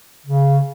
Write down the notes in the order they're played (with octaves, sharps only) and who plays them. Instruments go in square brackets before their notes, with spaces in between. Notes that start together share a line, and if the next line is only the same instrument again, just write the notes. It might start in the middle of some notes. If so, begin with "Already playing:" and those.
[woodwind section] C#3